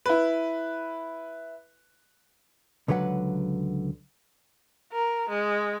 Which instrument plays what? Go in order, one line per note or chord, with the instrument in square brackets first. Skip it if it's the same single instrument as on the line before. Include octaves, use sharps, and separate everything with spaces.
[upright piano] E4 B4
[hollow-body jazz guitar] C#2 D3 F#3 B4 F#5
[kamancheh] A#4
G#3